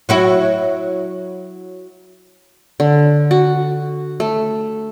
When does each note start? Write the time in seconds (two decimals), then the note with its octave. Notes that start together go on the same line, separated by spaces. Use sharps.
0.09 F#3 E4 F#4
2.80 D3
3.31 F#4
4.20 A3